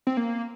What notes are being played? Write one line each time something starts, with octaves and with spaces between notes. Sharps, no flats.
C4
A#3